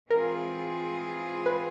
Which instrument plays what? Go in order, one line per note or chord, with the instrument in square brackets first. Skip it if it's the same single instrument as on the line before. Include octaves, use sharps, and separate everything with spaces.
[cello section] E3 G#3 C4 F4 G#4 [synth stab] A#4
[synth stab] B4